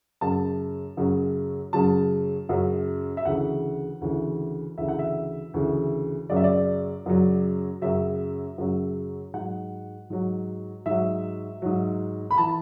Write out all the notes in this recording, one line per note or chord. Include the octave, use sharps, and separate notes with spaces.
F#2 C#3 F#3 A5
F#2 C#3 F#3
F#2 C#3 F#3 A5
F#2 C#3 F#3
E5
D2 C#3 E3 F#5
D2 C#3 E3
D2 C#3 E3 E5
F#5
E5
D2 C#3 E3
F#2 C#3 F#3 D5
E5
D5
F#2 C#3 F#3
F#2 C#3 F#3 E5
F#2 C#3 F#3
G#2 F#3 F#5
G#2 F#3
G#2 F#3 E5
G#2 F#3
B5
E3 A5